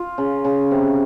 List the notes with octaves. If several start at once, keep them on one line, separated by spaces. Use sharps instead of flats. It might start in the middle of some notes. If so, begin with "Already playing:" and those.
Already playing: F4
C#3
C#3
C3